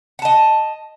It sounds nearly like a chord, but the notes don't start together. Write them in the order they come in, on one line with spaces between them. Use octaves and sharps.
F#5 A5 D#5